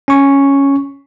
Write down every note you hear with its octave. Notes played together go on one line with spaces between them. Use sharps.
C#4 C#6